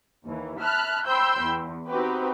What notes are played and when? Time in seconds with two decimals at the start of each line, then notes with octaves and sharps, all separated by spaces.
0.25 D#2 E3
0.59 E5 A5 B5 F6 F#6
1.06 C5 G5 B5 C6 E6 G6
1.42 E2
1.88 C4 D#4 F#4 G4 B4